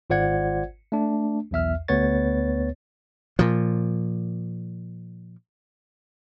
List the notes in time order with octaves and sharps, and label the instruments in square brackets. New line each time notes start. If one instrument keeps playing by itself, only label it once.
[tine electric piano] G#1 F4 C5 D5 F#5 G#6
A3 D4
B1 E2 E5 F6
D2 B3 B4 C#5 A6
[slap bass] A#2 F3